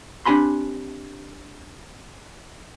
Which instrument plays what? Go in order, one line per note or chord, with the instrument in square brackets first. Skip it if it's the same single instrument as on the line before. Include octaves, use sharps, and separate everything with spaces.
[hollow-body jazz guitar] C4 D4 G4 G#5 B5 C6